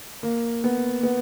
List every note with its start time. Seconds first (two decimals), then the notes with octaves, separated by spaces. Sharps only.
0.23 A#3
0.64 B3
1.03 B3